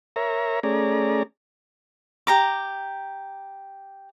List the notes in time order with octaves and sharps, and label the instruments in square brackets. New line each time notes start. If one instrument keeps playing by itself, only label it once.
[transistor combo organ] A#4 C#5 E5 A#5
A3 C#4 G#4 D5 A#5
[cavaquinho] G4 A#5 D6